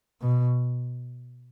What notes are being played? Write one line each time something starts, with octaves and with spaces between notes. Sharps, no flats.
B2